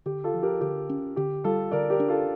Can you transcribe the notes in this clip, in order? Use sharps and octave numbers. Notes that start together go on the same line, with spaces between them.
D3 G4
F4 A4
F3
G4 A#4
D3 G4
C#4
D3 G4
G3 F4 A4
D3 A#4 D5
G4 A#4
D4
F4 A4